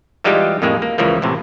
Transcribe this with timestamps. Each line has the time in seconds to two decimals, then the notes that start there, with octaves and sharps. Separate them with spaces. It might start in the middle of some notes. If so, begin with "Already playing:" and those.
0.24 E3 G3 G#3 D#4 F4 G4
0.62 F2 A2 G#3 A#3
0.82 A#3
0.98 C#2 C#3 E3 F3 A#3
1.22 A1 A2 C3